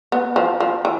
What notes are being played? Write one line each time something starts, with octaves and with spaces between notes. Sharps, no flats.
B3
F3
F3
E3